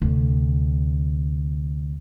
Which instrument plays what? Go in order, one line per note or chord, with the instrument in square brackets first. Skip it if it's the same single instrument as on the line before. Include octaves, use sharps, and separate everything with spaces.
[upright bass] D2 C3